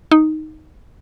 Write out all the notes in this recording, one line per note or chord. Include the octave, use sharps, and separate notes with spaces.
D#4